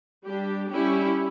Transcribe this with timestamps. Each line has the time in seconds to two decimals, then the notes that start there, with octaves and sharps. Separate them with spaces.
0.25 G3 D4 G4
0.69 G3 C#4 E4 G4